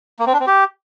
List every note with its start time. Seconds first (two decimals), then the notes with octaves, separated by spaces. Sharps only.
0.19 A#3
0.26 C4
0.33 D4
0.40 C4
0.47 G4